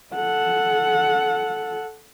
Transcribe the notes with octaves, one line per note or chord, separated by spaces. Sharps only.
A4 F#5